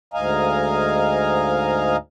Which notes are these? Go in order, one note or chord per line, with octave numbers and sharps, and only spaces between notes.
D2 G#2 D#5 F5 G#5 A#5